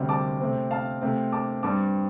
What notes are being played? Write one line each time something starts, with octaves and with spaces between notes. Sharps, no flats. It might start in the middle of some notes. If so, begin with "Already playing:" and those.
Already playing: D2 C3 G3 C4
A5 D6
C3 A3 C4
F5 A5
C3 A3 C4
A5 D6
G2 G3 C4 A5 D6